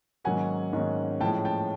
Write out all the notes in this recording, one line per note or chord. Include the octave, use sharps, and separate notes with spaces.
G#2 D#3 F#3 A#3 C#4 F#5 G#5
G#2 D#3 F#3 A#3 C#4
A2 F3 G#3 C#4 G5 A5
G5 A5